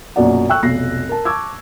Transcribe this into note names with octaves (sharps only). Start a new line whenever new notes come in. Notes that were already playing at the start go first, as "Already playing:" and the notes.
A#1 F#2 B2 F#3 D5 F#5
G5 C#6 E6 F#6
F1 B1 A#6 C7
A#4 A5
A5 C#6 D6 E6 G#6